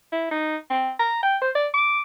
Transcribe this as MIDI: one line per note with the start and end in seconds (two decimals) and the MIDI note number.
0.12 0.29 64
0.31 0.56 63
0.70 0.91 60
0.99 1.23 82
1.23 1.36 79
1.42 1.50 72
1.55 1.67 74
1.74 2.02 86